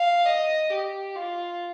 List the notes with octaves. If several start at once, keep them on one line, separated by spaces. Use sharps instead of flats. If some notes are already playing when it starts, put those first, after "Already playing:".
Already playing: F5
D#5
G4
F4